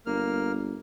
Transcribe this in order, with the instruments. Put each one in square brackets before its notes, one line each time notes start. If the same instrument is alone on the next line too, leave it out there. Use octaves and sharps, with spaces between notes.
[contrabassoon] G1 [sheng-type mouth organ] A#3 F6